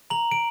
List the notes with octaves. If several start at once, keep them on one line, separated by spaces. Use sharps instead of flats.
A#5 F#7
D7